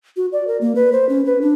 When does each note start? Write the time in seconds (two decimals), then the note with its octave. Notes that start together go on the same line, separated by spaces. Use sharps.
0.17 F#4
0.32 D5
0.48 A#4
0.61 A#3
0.75 B4
0.92 C5
1.09 C#4
1.26 B4
1.41 D4